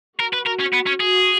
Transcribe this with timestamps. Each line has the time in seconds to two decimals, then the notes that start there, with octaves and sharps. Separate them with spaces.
0.20 F#4 A#4
0.33 B4
0.47 A#4
0.60 C#4
0.74 B3
0.87 C#4
1.00 F#4 G#4